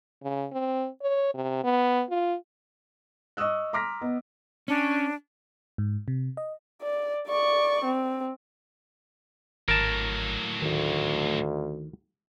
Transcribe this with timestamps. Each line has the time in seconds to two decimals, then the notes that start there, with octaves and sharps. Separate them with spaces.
0.23 C#3
0.53 C4
1.02 C#5
1.34 C3
1.64 B3
2.10 F4
3.37 D#5 C#6 D#6 E6 F#6
3.73 A#5 C6 D6 F6 A#6 B6
4.01 B3 D#5
4.68 C#4 D4
5.78 G#2
6.08 C3
6.37 D#5
6.83 D5
7.27 D5 C#6
7.84 C4
9.68 G#1 A2 F#3 A#4 A5
10.62 D2 D#3